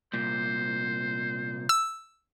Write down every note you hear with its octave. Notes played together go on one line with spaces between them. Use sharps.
C2 A#2 C5
E6